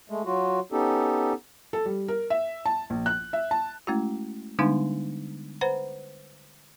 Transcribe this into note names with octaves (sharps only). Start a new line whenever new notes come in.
G#3 A3
F#3 F4 F#4
B3 C#4 D#4 G4 A4
A4
G3
A#4
E5
A5
A#1
F#6
E5
A5
G#3 A3 C#4 E4 F#4
D3 G3 G#3 B3 D4 D#4
B4 C5 F#5 A#5 B5